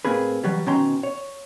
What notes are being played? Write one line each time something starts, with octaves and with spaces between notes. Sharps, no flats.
A2 A#3 C4 G#4 B4
E3 F#3 G3
B2 D#3 C#4 G5 A#5 C6
C#5